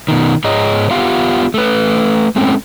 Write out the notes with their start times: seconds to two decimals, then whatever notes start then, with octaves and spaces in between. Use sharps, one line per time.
0.08 B2 D#3
0.44 G#2 G#4 C#5 D#5 A#5
0.91 B3 F4 G4 F5 F#5
1.54 A3 B4
2.36 G#3 A3 C4 C#4 A4